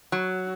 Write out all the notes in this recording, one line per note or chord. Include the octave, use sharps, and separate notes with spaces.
F#3